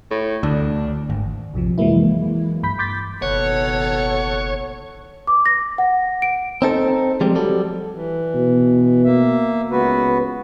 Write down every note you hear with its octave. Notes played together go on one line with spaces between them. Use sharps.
A2
D2 D4
G#1
A#1 F2 C3 F3
E3 F#3 G#3 A#3 E4
G2 B5 G6 B6
C6 D6 G6 A6 B6
F#1 B2 D#3 A4 C#5 F#5
D6
A#6
F#5
D7
C4 D#4 A4
F3 G3 G#3 C4
F#3 G3 A4
E3
B2
A#3 E5
C#2 B3 F#4 B4